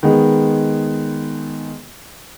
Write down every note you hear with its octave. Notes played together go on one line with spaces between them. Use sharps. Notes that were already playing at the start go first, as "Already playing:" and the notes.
D#3 G#3 B3 G#4